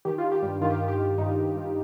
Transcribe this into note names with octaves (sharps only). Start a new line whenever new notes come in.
D#3 G4
F4
D#3
G4
G2
D#3 F4
G4
D#3 F4
G4
D#3 F4
G2 D#4
G2
G2